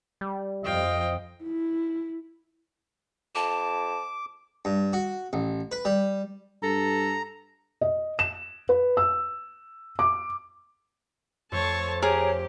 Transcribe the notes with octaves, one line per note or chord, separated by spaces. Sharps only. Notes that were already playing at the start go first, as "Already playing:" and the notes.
G3
F2 F3 D#5 F5 G5
E4
F2 A5 D6
G2
F#4
A1
B4
G3
G2 A4 A#5
D#5
E7
B4
E6
D6
F2 A3 C5 C#5 A5
G4 G#4 A#4 C#5